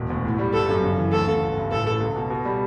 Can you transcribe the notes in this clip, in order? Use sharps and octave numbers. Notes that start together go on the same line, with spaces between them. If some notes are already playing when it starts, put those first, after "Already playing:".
Already playing: E1
D2
A2
G3
G1 A4
F#2
C#3
E3
D2 A4
C#3
G1
G2
A1 A4
A2
C#2
B2
B2
G3